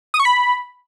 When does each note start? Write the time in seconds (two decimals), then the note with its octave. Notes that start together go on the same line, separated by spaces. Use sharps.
0.14 D#6
0.20 C#6
0.25 B5